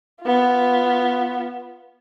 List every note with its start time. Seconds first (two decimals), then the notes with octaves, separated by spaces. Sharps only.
0.22 B3 F4